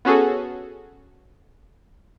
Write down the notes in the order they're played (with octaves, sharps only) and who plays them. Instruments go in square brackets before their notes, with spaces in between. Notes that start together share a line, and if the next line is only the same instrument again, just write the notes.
[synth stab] B3 C#4 F#4 G#4 A4